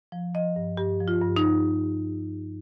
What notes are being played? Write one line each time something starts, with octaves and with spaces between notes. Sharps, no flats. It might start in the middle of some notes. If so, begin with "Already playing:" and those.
F3
F3 D#5
G2
G2 G4
F3
F4
G2
D#4